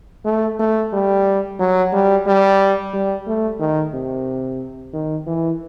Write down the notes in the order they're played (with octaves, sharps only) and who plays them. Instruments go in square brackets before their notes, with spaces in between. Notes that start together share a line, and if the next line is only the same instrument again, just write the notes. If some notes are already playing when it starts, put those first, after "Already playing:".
[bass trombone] A3
A3
G3
F#3
G3
G3
G3
A3
D#3
C3
D#3
E3